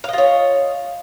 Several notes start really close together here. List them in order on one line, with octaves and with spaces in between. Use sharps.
F5 D#5 F4 C#5